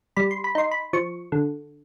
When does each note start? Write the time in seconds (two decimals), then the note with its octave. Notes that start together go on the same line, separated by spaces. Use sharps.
0.16 G3 B5
0.31 C6
0.44 B5
0.55 D#4 C6
0.71 B5
0.93 F3 C#6
1.32 D3